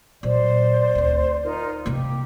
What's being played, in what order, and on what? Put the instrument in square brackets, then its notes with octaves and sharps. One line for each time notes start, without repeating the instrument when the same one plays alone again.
[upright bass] A#2 F#3 [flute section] C5 D5
[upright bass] D2 C4
[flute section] D#4 F4 A#4
[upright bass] C3 A#3 [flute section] G4